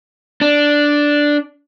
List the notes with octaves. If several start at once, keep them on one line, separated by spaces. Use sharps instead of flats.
D4